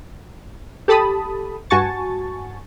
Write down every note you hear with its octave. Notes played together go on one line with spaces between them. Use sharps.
G4 A4 A5 B5 D#6
G2 F#4 G#5 A5 C#6 A6